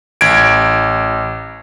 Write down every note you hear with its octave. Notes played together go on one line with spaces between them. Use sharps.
A1 G#6 D7